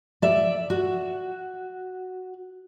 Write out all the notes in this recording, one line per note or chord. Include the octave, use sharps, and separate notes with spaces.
D5 E5
F#4